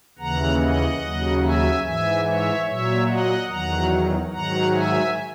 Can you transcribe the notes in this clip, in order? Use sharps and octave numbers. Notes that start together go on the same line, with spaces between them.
D#2 C#3 E3 F#5 A#5
D#5 F#5
D#2 C#3 F#3
E5 G#5
G#2 E3 E5 G#5
C#5 E5
A#2 F#3 C#5 E5
D#5 F#5
E2 D#3 F#3 F#5 A#5
G#2 D#3 F#3 F#5 A#5
E5 G#5